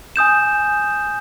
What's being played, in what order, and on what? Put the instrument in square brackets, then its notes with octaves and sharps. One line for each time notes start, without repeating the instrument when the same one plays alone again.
[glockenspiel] G#5 D#6 G6 E7